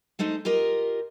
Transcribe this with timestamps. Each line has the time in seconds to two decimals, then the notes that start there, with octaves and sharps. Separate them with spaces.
0.19 G#3 A3 D#4 C5 D#5
0.45 F4 G4 A#4 D#5